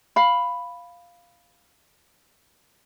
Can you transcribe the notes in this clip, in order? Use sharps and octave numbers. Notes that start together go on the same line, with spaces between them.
F5 B5